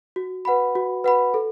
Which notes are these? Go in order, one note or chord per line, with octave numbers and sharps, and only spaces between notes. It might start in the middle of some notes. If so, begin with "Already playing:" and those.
F#4
B4 F#5 B5
F#4
B4 F#5 B5
A4